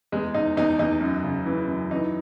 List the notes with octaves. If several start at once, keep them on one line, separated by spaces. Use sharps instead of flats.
E2 G#3
E2 D#4
E2 D#4
E2 D#4
F#2
C#3
E3
F#2
E3 D#4